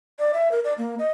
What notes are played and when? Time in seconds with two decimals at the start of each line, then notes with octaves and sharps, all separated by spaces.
0.19 D5
0.34 E5
0.52 A#4
0.64 D5
0.78 A#3
0.99 D#5